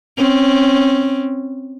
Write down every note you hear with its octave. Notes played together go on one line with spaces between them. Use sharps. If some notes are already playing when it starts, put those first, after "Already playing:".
C4 C#4